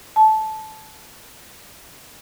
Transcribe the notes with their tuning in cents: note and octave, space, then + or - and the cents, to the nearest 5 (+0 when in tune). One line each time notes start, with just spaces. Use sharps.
A5 -15